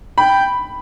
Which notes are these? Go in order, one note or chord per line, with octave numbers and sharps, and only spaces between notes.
G5 B5